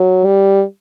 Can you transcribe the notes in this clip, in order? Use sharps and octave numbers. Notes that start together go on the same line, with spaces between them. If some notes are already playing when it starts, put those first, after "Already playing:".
Already playing: F#3
G3